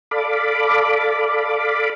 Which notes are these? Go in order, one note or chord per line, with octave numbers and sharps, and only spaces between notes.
A4 D5 F5 B5 D6